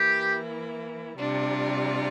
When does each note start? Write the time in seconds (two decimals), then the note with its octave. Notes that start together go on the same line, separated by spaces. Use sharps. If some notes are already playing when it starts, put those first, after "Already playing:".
Already playing: E3 A#3 E4 G4
1.17 C3 G3 D4 F4